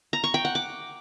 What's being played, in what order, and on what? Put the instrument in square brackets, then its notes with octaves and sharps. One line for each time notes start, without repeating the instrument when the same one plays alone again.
[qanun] A#5
C#6
G5
F#5
D6